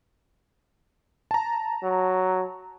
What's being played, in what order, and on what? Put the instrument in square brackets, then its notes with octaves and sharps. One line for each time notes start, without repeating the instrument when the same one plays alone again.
[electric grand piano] A5 A#5
[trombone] F#3